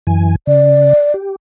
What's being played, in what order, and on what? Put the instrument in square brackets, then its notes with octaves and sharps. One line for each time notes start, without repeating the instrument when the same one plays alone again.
[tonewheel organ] F#2 E3 G#5
[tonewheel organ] C#3 [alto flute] D5
[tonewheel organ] G4